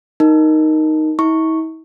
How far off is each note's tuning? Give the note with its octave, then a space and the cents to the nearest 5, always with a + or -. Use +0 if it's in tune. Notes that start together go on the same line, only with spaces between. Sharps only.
D#4 +0 A#4 +0
E4 -45 C#6 +0